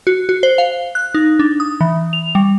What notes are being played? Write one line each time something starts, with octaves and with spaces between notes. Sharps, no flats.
F#4
F#4
C5
F5
F#6
D#4
D4
D#6
E3
F7
G3